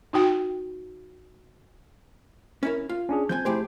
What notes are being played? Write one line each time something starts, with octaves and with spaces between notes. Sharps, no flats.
D#4 F#4 G5
C#4 E4 A#4
F4
C#4 D4 G#4
F3 C4 G#5 G6
A3 E4 G4 G#4 C5